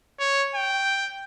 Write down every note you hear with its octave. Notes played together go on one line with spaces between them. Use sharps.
C#5
G5